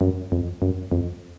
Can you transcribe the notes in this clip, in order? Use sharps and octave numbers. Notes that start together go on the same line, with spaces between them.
F#2
F2
F#2
F2